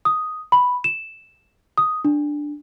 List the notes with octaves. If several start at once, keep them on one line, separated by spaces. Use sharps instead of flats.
D#6
B5
E7
D#6
D4